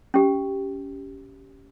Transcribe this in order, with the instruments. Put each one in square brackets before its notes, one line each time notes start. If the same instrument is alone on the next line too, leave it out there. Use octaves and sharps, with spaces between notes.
[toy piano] C#4 G4